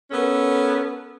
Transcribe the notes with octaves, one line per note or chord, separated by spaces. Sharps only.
B3 C#4 A4 A#4